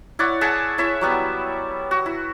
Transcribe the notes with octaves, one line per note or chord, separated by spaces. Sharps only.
E4 C#5 D5 F#5
G#4 E5 F#5 A5
E4 C#5 E5
F#3 G3 B3
F#4
E4